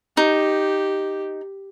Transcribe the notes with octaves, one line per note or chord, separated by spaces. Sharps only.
D#4 G4